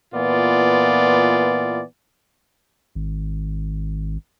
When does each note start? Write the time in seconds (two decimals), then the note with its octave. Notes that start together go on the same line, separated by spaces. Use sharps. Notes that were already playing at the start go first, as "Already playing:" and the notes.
0.15 A#2 E3 B3 F4 D5
2.95 G#1